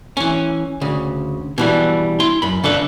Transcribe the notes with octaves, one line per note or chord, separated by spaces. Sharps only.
E3 C#4
D2 C#3
B2 E3 G3
E4 C6
F#2 B5
C#3 D4 A4 B4